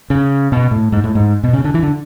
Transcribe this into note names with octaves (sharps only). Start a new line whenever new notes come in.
C#3
B2
A2
G#2
A2
G#2
B2
C#3
D3
E3
D3